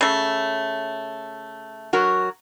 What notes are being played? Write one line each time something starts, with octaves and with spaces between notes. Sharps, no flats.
C#3 A3
F#3 F#4 A#4